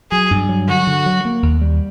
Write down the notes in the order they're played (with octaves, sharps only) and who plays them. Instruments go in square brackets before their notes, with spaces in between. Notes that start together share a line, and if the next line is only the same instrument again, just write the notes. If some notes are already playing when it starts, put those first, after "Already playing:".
[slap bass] F#3 [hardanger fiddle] G#4
[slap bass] G2
F#3
[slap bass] D3 [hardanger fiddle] F#4
[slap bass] D3
F#3
A#3
D#2
G3